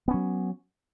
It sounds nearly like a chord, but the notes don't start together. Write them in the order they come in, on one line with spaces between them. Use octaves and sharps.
B3 C#4 F#3